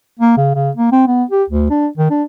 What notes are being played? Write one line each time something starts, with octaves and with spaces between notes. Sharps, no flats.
A#3
C#3
C#3
A#3
C4
B3
G4
D2
D4
D#3
D4